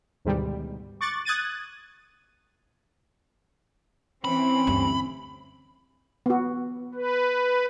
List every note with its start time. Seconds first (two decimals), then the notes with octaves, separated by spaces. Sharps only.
0.25 D2 G#2 B2 D#3 G3
1.01 C#6 D6 F#6 A6
1.25 D#6 F#6 G#6 A6 D#7
4.25 E3 C4 C#4 B5
4.67 D2 G2
6.26 B3 F#4
6.94 B4